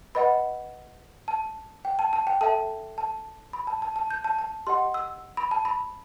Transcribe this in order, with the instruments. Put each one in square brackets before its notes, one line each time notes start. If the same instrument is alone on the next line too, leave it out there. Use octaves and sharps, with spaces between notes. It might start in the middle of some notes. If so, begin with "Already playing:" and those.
[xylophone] B4 D#5 F#5 B5
A5
G5
A5
A5
G5
A4 E5 G5 A5
A5
B5
A5
A5
A5
G6
A5
A5
G4 D#5 F#5 C6
E6
B5
A5
B5